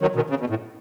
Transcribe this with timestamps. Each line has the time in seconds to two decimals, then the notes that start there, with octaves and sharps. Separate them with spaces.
0.02 D#3 F#3
0.15 B2 D#3
0.30 C#3
0.40 B2
0.50 A2